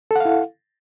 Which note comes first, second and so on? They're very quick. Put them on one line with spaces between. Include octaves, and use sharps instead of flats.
A4 F#5 F5 E4